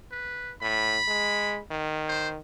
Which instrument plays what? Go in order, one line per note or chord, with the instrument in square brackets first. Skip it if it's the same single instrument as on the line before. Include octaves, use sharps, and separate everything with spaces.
[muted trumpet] B4
[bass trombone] A2 [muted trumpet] B5
[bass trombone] G#3
D#3
[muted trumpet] C5